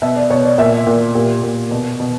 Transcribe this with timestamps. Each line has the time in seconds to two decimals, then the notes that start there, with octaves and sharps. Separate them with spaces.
0.02 B2 E5
0.16 D5
0.30 B2 C#5
0.45 D5
0.58 A#2 E5
0.87 A#2
1.15 A#2 G4
1.43 A#2
1.71 B2
2.00 B2